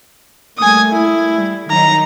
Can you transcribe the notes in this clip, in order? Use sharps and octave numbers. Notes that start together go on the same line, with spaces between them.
G3 A3 A#3 G#5 D#6
E4
G3
D#3 F#3 D#4 A#5